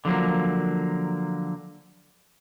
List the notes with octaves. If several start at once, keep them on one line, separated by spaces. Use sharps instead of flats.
D3 F3 F#3 A#3